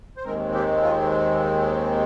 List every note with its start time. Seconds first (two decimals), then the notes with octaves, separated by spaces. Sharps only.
0.17 C5
0.25 D#2 D#3 G#3 C4 A#4
0.54 G4
0.83 F4